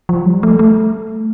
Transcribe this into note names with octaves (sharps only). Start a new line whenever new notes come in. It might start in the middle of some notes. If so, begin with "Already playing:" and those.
F3
G3
A3
A3